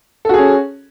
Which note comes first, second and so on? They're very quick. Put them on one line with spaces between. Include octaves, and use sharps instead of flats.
A4 F#4 G#4 C#4